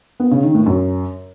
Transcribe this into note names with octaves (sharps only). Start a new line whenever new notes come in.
B3
C#3
D#3
A2
F#2